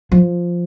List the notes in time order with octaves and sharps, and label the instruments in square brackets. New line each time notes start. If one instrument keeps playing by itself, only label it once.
[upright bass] F3